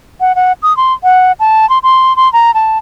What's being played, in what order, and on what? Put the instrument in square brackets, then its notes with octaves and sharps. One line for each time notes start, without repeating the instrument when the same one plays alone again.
[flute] F#5
F#5
D#6
C6
F#5
A5
C6
C6
C6
A#5
A5